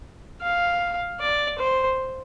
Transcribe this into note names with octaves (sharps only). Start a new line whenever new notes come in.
F5
D5
C5